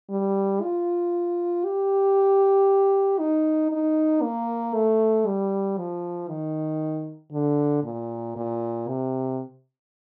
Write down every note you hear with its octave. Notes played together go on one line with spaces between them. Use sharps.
G3
F4
G4
D#4
D#4
A#3
A3
G3
F3
D#3
D3
A#2
A#2
C3